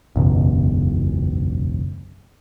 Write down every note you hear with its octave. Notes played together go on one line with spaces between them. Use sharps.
E1 B1 F#2 C#3